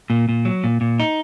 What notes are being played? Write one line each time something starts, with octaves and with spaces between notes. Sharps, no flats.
A#2
A#2
F#3
A#2
A#2
D#4